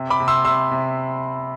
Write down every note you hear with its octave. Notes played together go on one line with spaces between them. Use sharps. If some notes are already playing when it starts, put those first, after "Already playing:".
Already playing: C3
B5 D6
C3
C6 E6
C3 C6 E6
C3